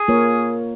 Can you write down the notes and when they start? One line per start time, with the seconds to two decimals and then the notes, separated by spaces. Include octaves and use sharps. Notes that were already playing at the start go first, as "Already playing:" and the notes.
Already playing: G#4
0.08 A#3 F4 A#4 C#5